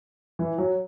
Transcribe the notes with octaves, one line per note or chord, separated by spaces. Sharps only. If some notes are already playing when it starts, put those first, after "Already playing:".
E3
F#3